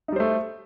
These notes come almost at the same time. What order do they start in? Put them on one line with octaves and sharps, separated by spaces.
D#4 G3 C5 A3